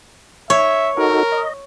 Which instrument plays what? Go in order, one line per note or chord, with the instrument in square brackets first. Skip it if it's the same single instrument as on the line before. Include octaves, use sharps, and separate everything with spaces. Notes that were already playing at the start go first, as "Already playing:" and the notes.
[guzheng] C#5 [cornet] E5
[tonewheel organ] D#4 F#4 A4 [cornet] A#4
[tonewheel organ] D#5